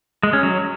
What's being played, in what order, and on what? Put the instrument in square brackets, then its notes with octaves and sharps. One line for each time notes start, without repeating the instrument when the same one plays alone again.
[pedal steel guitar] G#3
C#4
F#3